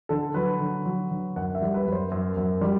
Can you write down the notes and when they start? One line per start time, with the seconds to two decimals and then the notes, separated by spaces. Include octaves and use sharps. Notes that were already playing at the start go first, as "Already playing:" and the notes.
0.09 D3 A4
0.34 F#3 B4
0.60 D3
0.86 F#3
1.11 D3
1.36 F#2 F#5
1.55 E5
1.62 G3
1.74 B4
1.87 F#2
1.92 C5
2.11 F#2
2.37 F#2
2.61 G3